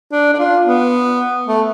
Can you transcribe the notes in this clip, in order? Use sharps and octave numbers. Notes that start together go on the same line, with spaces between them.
D4
D4
F4
B3
A3